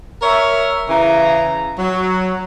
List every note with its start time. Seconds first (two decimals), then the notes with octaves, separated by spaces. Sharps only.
0.22 A#4 C#5 E5
0.90 C#3 E3 A#5
1.79 F#3